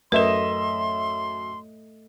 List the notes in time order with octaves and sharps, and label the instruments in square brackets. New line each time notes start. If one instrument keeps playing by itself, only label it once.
[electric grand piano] F#2 E5 E7 [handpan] A3 D#5 [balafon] A#4 B4 [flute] C6